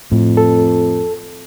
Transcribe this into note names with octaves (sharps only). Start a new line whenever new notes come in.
F2 A2
A4